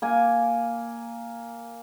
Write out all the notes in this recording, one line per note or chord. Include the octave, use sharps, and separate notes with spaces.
A#3 G#5